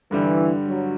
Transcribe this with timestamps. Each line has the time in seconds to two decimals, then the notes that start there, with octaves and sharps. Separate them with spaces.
0.11 G2 D3 E3 G3
0.67 F#3